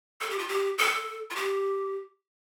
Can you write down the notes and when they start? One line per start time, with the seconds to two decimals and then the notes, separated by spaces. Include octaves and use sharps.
0.21 A4
0.30 G4
0.39 F4
0.48 G4
0.78 A4
1.30 F4
1.35 G4